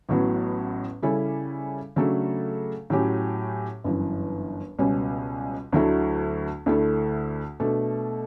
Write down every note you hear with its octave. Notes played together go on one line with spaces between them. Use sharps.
A1 A2 F#3 B3
C#3 G3 C#4 E4 A4
C#3 F#3 A3 D4 A4
A2 F#3 C#4 G4
G1 F#2 E3
C#2 B2 G3 C#4
D2 D3 F#3 A3 E4
D2 D3 A3 E4 A4
B2 A3 D4 A4